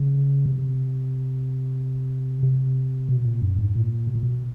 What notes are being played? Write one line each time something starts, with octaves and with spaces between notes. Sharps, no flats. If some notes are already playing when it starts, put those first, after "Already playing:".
Already playing: C#3
C3
C3
B2
A#2
F#2
G#2
A#2
B2
A#2
B2